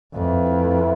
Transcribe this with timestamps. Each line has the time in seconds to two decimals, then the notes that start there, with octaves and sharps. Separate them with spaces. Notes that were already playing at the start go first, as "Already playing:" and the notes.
0.14 F2 A2 E3 A3
0.46 A2 E3 A3
0.77 B3 E4